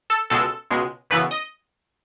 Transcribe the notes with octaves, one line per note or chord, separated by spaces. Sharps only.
A4
C#2 B2 G#3 A4
C#2 B2 G#3
F#2 C#3 E3 B3 B4
D#5